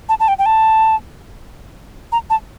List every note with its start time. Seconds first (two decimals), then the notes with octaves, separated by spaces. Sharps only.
0.09 A5
0.20 A5
0.28 G5
0.39 G5
0.46 A5
2.12 A#5
2.30 A5